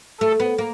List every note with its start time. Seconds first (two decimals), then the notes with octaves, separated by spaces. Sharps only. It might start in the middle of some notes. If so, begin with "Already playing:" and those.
0.21 A3 A4
0.40 B3
0.58 A#3